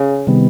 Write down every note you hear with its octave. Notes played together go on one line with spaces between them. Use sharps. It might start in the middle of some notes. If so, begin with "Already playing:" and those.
Already playing: C#3
C3 D#3 G3 B3